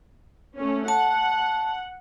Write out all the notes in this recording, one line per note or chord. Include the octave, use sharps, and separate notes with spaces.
A3 C#4
F#5 A5